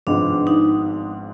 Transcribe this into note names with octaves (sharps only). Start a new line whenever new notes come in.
G#1 G#2 F3 G#3 B3 D4
D#4